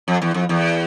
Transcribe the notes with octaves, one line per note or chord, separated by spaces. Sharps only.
F2
E2
F2
E2